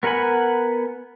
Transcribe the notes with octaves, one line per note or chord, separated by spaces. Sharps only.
B3 A#4 F#5 G#5 B5